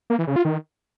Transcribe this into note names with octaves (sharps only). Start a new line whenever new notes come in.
A#3
E3
C#3
F4
D#3